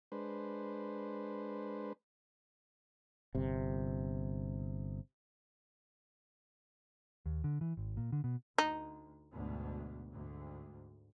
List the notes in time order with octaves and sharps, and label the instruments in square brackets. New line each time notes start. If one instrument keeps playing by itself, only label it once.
[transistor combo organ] G#3 D4 B4 C5
[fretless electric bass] G1 C3
[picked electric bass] D#2
D3
E3
G#1
A#2
D3
B2
[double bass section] D2 [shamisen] D#4
[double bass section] D2 G#2 B2
D2 G#2